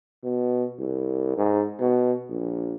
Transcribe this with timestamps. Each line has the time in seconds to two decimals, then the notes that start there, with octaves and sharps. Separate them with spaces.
0.24 B2
0.79 C2
1.37 G#2
1.80 B2
2.29 A#1